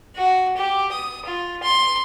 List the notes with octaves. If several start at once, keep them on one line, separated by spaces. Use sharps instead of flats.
F#4
G4
D#6
F4
C6